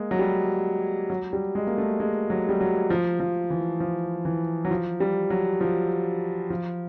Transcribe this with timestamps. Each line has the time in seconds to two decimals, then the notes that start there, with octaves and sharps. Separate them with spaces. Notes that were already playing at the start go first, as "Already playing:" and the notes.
Already playing: G#3 A#3
0.11 F#3
0.19 G3
1.10 F#3
1.33 G3
1.55 G#3
1.67 A#3
1.78 A3
2.00 G#3
2.30 F#3
2.49 G3
2.61 F#3
2.90 F3
3.20 F3
3.50 E3
3.80 F3
4.25 E3
4.65 F#3
4.71 F3
5.00 G3
5.30 F#3
5.61 F3
6.50 F3